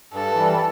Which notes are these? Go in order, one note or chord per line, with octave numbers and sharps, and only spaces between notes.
G2 A4
E3 G3